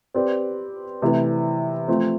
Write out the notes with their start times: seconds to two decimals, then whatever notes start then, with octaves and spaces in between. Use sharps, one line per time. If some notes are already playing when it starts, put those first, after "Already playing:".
0.14 C4 G4 B4 D5
1.02 C3 E3 A3 E4 B4
1.88 F3 A3 C4